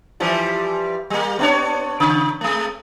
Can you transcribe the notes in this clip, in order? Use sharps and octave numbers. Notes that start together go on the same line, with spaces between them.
E3 F3 G3
G3 A#3
B3 D4 C#5
C#3
G#3 A3